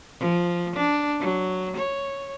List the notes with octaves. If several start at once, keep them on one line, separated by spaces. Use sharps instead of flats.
F3
D4
F#3
C#5